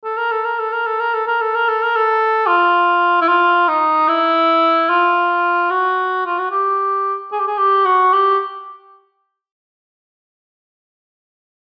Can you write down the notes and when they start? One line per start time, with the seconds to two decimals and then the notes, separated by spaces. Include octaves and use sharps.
0.05 A4
0.18 A#4
0.32 A4
0.45 A#4
0.59 A4
0.73 A#4
0.87 A4
1.00 A#4
1.14 A4
1.27 A#4
1.41 A4
1.55 A#4
1.69 A4
1.83 A#4
1.96 A4
2.47 F4
3.21 E4
3.28 F4
3.69 D#4
4.09 E4
4.89 F4
5.70 F#4
6.26 F4
6.39 F#4
6.51 G4
7.32 G#4
7.40 G4
7.47 G#4
7.58 G4
7.86 F#4
8.13 G4